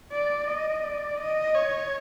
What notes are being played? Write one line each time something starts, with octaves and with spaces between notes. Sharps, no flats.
D5
D#5
D5
D#5
C#5